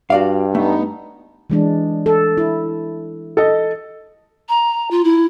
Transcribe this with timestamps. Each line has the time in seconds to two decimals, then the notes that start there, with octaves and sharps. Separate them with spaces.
0.10 G2 F#4 D5 F5
0.55 A3 B3 D#4
1.50 E3 G#3 D4
2.06 A4
2.38 E4
3.37 A4 D#5
4.49 A#5
4.91 F4
5.04 E4